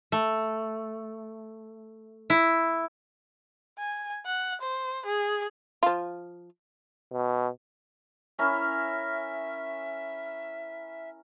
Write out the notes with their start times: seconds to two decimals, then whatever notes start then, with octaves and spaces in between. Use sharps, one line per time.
0.12 A3
2.30 E4
3.79 G#5
4.26 F#5
4.61 C5
5.06 G#4
5.83 F3 F4
7.13 B2
8.39 C#4 E4 A#4 E5